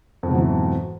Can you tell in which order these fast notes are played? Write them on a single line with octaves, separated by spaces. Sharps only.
F2 G#2 B2 F#3 E3